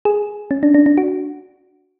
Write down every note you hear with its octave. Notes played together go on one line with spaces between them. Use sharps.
G#4
C#4
D4
D4
D4
F#4